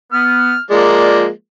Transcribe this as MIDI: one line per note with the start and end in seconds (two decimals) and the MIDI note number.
0.13 0.54 59
0.13 0.61 89
0.71 1.30 53
0.71 1.30 56
0.71 1.30 58
0.71 1.22 74